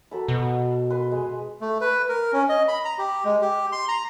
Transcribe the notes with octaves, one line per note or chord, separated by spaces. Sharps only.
F#3 A4 B5
B2
B4 C6
G#3
A3
B4
A#4
C#4
D#5
B5
A#5
G4
G#3
G4
C6
A#5